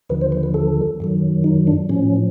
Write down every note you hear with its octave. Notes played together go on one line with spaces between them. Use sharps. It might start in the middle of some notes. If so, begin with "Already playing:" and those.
D#2 D3 F3 B4
C5
B4
B4
A4
F#2 D#3 F#3
D#4
D4
A2 F3 C#4